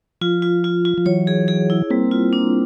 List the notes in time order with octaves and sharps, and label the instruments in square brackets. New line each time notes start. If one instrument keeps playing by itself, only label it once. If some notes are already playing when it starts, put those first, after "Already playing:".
[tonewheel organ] F3 [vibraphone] F4
[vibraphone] F4
F4
F4
[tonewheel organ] F3
[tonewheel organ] E3 F#3 [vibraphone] C#5
[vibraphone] G#4
G#4
E4
[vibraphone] G3 [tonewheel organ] A#3 C4
[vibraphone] F4
D4